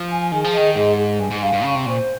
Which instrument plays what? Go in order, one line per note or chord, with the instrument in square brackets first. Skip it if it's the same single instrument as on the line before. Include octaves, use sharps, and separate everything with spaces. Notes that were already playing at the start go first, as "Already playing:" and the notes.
Already playing: [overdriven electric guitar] F3
[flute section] G#5
[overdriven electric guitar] D#3 [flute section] G#4
[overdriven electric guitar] F3
[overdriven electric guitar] D#3 [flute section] D#5
[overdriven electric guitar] G#2 [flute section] G#4
[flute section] G#4
[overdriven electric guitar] G2 [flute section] G#5
[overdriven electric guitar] G#2
[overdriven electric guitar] G2 [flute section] F5
[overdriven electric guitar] G2
[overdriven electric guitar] C#3 [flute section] C#6
[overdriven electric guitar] C3
[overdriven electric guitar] A#2 [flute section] C5